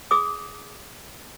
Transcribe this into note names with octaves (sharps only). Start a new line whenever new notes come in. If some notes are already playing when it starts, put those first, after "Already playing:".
G#4 D6 D#6